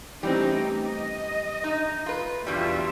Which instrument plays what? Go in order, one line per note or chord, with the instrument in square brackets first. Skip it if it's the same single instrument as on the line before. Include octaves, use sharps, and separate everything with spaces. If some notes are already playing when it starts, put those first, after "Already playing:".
[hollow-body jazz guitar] E3 G3 C4 [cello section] A3 C#4 D#4 [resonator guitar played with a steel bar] G4
[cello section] D#5
[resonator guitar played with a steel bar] D#4
F4 B4
[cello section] E2 F4 E5 [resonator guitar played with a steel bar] G2 B2 G3